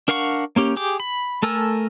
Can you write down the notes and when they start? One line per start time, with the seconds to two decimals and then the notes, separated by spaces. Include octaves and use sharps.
0.08 D4 A#4 F5 F#5 C#6
0.56 A#3 C#4 G4
0.76 G4 G#4 D6
1.00 B5
1.43 A3 A4 A#4 G#5 E6